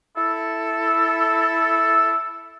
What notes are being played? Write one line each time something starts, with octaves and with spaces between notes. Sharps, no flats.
E4 A4